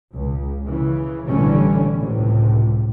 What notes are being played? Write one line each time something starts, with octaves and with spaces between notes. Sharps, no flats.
C#2
C#3 E3
A1 D3 E3 G3 A3 C#4
C#2 A2 C3